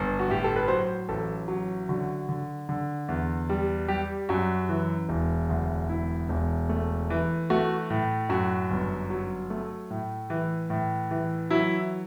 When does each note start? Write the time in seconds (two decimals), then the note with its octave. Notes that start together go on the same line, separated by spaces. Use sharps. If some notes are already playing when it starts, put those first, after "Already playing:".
Already playing: G1 G2
0.19 F#4
0.28 A2 G4
0.44 A4
0.56 B4
0.68 F#3 C5
1.08 A1 A4
1.48 F#3
1.89 D3 F#4
2.29 D3
2.69 D3
3.09 E2
3.49 G3
3.88 G3 G4
4.29 F#2 F#4
4.69 E3
5.09 E1
5.49 D2
5.89 E1 E4
6.29 E1
6.69 A3
7.10 E3
7.50 A3 F#4
7.90 A2
8.29 F#2 F#4
8.71 G1
9.10 F#3
9.50 A3
9.90 A2
10.30 E3
10.70 A2
11.11 E3
11.50 F#3 E4